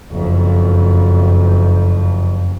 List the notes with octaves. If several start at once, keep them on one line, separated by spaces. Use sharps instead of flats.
F#1 F2